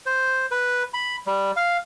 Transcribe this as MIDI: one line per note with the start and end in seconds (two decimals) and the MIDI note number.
0.06 0.46 72
0.51 0.83 71
0.94 1.16 83
1.27 1.52 55
1.56 1.77 77